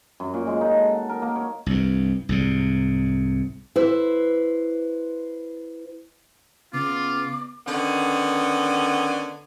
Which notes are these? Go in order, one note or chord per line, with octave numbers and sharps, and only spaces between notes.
F#2
A#2
G#3
D#4
A4
F#5
A#4
A#3
C#5
C2 G2
C2 G#2 C3
E4 B4 C5
C#3 B3 F4 D6
D3 D#3 B3 C#4